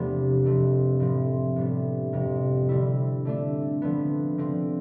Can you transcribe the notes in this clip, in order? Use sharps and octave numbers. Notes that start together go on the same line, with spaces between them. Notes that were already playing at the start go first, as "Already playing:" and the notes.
Already playing: E2 C3 F3 A3 B3 D4
F2 E3 A3 C4
A2 F3 C4
A2 G3 B3 D4
F2 C3 F3
D3 G3 C4 E4
D3 A3 D4
D3 F3 B3
D3 F3 C4